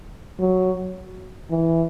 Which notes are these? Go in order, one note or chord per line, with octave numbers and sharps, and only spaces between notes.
F#3
E3